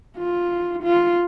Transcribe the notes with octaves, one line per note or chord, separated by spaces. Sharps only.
F4
F4